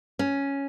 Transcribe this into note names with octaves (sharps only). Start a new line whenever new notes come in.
C#4